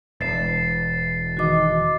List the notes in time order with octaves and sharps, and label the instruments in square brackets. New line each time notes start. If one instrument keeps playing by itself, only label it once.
[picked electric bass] E1 [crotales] A6 C7 E7
[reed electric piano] E2 D#3 D#5 [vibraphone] F#4 D6